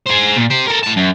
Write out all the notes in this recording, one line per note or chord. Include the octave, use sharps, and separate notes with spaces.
G#4 C5
A#2
G4 C5
A4 A#4
A2 A5
F#2